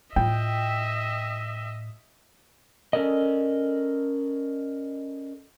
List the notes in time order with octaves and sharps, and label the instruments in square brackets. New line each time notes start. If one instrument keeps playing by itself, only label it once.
[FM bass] A2 [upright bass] F4 [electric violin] D#5 E5 [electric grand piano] G5
[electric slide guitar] C#4 A4 A#4 D5 D#5